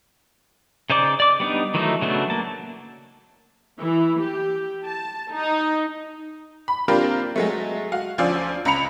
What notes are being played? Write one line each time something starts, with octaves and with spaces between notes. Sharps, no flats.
C#3 D#4 C5 D5 D6
D5 D6
G3 B3 D4 D#4
D#3 E3 F#3 A3 D#4
C#3 F#3 A3 B3 D4
A#3 A5
E3
G4
A5
D#4
B5
A#3 C4 D4 F4 G4 A#4
F#3 G#3 A3
F#4 F5
D2 F3 C#4 D5 F5 E6
C#2 A#5 B5 C#7 F7